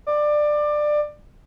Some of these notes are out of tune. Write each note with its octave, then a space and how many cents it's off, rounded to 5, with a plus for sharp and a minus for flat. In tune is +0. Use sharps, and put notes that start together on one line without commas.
D5 +20